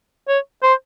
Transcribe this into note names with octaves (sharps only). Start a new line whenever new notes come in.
C#5
C5